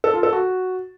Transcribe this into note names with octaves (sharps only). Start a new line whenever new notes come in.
A4
F4
A4
F#4